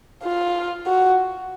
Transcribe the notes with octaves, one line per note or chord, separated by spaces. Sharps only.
F4
F#4